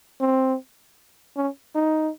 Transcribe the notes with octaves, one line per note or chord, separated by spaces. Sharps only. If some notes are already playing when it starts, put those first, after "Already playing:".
C4
C#4
D#4